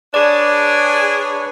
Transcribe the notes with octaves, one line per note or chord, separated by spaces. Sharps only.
D4 G#4 B4 C#5 D5 D6